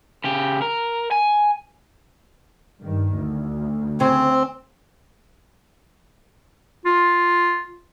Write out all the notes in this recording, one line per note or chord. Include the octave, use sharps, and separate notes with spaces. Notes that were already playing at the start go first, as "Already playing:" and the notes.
C#3 G4
A#4
G#5
G2 D#3
D2
C#3 C4 C5
F4